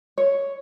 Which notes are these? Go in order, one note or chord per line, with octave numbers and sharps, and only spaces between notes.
C#5